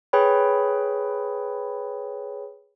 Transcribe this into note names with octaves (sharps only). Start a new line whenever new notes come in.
G#4 B4 C#5 G5 B5